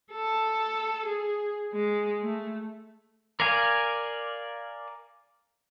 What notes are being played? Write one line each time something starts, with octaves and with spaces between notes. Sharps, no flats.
A4
G#4
G#3
A3
A#4 D5 F5 G#5